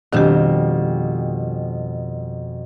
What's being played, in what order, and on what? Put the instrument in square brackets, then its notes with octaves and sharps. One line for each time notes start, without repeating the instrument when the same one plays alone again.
[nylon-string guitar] F2 B2 G3 [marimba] D#3 D4 G4